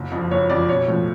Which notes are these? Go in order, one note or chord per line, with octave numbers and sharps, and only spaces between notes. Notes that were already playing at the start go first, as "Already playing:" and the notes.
Already playing: F#1
F2 F3
F#1 C#5
F2 F3 D5
B1 C#5
A2 F3